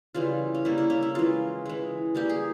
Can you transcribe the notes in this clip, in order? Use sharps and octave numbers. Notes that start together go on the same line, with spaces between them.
C#3 E3 G3 F4
C#4
C#3 G3 A#3 E4
E4
C#4
E4
E3 G#3 F4
E3 G#3
E3 G3 A#3 G4
G#4